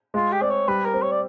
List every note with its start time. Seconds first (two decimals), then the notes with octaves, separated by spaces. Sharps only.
0.14 G#3 F4
0.32 G4
0.41 C4 D5
0.50 C#5
0.68 G3 B4
0.85 A#4
0.93 C4
1.02 C#5
1.11 D5